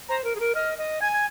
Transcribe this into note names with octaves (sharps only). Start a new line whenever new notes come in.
C5 A#5
A#4
G#4
A#4
D#5 F6
D#5
G#5 G#6
G#6